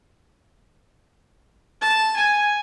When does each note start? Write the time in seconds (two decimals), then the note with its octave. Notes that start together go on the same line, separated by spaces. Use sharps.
1.81 A5
2.16 G#5